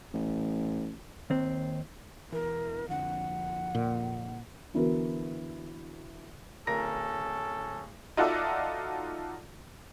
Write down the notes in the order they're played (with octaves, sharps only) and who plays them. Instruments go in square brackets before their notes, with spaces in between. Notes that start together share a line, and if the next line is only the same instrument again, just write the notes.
[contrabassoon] A1
[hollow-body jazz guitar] D#2 C4
[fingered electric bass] E1 E3 [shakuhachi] A#4
[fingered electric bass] F2 D3 F3 [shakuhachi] F#5
[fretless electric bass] A#2
[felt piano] D3 E3 B3 E4 F#4 A#4
[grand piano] D1 A#4 A#6 [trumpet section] C#4 A4
[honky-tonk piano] D#4 F4 F#4 A4 D5 E5